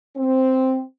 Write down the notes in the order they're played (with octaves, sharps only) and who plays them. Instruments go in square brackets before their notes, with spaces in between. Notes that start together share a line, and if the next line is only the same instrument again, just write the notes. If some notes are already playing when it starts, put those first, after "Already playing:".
[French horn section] C4